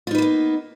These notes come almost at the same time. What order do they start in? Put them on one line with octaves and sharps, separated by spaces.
F4 D#4 B4 A#3 B3